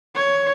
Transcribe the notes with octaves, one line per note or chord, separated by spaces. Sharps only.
C#5